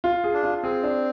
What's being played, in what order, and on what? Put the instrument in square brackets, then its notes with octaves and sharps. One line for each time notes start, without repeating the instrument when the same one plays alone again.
[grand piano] F4
G#4
[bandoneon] D4
[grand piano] F4
[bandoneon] C4 [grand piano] G#4
[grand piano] D4